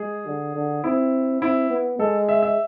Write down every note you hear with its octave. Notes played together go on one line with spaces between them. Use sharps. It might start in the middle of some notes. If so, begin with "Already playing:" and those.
Already playing: G#3 G#4
D3
D3
C4 E4
C4 E4
B3
G#3 A4
E5
E5